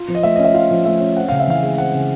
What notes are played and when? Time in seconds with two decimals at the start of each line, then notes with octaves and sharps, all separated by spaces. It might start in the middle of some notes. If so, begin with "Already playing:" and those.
Already playing: F4
0.08 F3
0.15 D#5
0.23 A3 E5
0.36 C#4 D#5
0.44 E5
0.54 F4 F5
0.71 F3
0.85 A3 E5
1.00 C#4
1.16 C4 F#5
1.28 C#3 F5
1.40 E5
1.47 E3 F5
1.63 G#3
1.78 C4 F#5
1.94 C#3